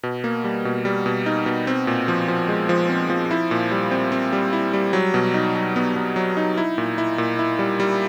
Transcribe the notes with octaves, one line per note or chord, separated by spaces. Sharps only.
B2
A#3
G3
B2
G3
B2
D#4
B2
C4
A#2
F3
F3
G#3
F3
C4
F3
E4
A#2
G3
C4
C4
G3
E4
G3
F#3
B2
D#4
F#3
B3
B3
F#3
D#4
E4
A#2
E4
A#2
E4
G3
G3